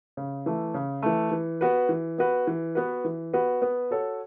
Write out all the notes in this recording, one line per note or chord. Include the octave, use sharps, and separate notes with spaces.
C#3
E3 A3
C#3
E3 A3
E3
B3 F#4 B4
E3
B3 F#4 B4
E3
B3 F#4 B4
E3
B3 F#4 B4
B3
F#4 A4 C#5